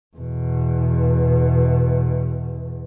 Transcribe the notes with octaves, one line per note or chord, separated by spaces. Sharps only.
E2 B2